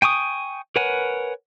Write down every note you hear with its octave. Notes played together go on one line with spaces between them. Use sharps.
G5 G#5 C#6 D#6
A#4 B4 C#5 F#5 G#5